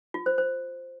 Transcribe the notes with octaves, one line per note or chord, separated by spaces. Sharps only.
F4
C5
C5